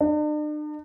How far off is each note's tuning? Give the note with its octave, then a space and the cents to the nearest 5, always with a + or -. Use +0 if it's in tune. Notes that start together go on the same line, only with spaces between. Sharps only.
D4 +45